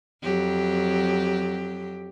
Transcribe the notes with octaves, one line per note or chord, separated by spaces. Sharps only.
F2 F#3 G4